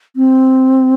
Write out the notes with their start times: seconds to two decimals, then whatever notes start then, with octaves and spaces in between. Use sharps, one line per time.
0.16 C4